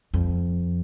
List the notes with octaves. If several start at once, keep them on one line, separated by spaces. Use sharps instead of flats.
F2